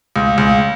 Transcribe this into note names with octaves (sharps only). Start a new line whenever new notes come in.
C#2
C#2